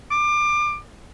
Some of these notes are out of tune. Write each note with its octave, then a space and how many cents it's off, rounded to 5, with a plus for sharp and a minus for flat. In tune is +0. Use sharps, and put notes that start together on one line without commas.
D6 +25